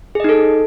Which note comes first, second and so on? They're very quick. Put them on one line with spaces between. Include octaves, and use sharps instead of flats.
G#4 D#5 D#4 A4